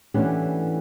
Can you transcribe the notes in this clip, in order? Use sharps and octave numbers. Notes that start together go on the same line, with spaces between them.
E3 A3 B3 C#4 D4 G4